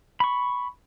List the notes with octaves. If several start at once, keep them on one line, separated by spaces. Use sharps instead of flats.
B5 C#6